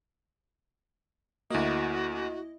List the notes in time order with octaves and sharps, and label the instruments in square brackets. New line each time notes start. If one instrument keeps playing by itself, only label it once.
[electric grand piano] D2 A#3 [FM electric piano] E4 D#5 [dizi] F#4